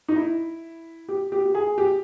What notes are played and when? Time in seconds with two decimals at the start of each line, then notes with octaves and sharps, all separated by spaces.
0.08 D#4
0.16 E4
1.09 G4
1.32 G4
1.46 G4
1.55 G#4
1.78 G4